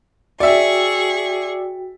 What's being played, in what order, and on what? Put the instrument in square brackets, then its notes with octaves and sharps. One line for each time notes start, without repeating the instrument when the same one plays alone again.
[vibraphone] F#4 G5 [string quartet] G#4 C#6 [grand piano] D5 E5